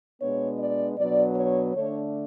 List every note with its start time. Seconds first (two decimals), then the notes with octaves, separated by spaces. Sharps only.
0.22 B2 G#3 B3 D4 C#5
0.60 D5
0.98 B2 F#3 B3 D4 D5
1.36 C#5
1.74 D3 A3 D4 C#5